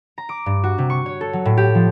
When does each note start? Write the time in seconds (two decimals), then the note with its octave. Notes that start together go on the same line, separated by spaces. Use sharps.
0.18 A#5
0.29 D6
0.46 G2
0.64 F#4
0.78 C3
0.90 C#6
1.06 C#5
1.21 A4
1.33 F#3
1.45 A2
1.57 G4
1.75 F3